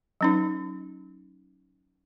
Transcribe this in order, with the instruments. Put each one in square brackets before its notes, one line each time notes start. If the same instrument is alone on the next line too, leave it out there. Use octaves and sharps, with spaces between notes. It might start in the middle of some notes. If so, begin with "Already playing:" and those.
[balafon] F#3 C#4 D#4